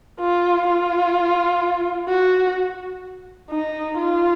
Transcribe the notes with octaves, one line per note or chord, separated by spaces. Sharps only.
F4
F4
F#4
D#4
F4